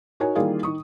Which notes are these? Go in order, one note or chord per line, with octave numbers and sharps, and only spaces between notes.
D#4 F#4 A#4 C#5 G#5
D#3 E3 G3 A#3 F4 G#4
D#3 C#6 D#6